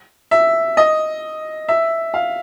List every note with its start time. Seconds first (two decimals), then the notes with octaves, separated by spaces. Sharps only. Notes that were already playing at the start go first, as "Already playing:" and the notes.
0.31 E5
0.77 D#5
1.68 E5
2.14 F5